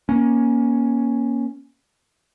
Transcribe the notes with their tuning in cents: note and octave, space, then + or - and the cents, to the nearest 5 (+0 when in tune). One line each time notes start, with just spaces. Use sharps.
A#3 +25 C#4 +0